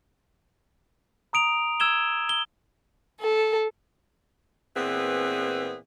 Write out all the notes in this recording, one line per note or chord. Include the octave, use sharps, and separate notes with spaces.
A#5 D#6 D7 F7
E6 G#6 E7 G7
G7
A4
A#2 E3 B3 C4 G#4